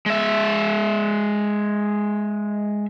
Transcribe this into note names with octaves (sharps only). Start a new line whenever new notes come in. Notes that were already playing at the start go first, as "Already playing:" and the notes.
G#3 E5